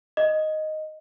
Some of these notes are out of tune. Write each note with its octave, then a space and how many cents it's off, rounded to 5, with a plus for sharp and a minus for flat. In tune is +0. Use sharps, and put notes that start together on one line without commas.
D#5 +0